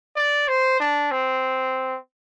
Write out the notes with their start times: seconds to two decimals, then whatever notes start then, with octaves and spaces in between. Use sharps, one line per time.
0.16 D5
0.48 C5
0.80 D4
1.11 C4